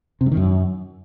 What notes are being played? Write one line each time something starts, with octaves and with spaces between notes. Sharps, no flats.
C3
G2
D#3
F#2